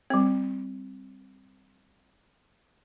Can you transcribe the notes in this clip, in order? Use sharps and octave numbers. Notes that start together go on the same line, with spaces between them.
G3 C4